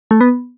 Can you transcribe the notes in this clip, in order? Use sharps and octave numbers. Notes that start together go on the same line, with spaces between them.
A3
B3